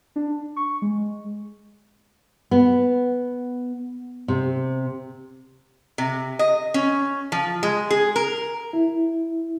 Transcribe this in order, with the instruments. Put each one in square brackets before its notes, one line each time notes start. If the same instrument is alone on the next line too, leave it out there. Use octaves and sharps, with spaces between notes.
[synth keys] D4
C#6
G#3
[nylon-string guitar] B3
C3
[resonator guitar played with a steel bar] C3
D#5
C#4
F3
G#3
G#4
A#4
[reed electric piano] E4